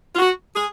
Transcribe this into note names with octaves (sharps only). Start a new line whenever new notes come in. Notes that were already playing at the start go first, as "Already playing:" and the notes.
F4
F#4
G#4